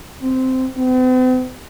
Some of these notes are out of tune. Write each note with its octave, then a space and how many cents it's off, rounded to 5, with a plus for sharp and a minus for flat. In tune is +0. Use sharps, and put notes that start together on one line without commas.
C4 -10
C4 -45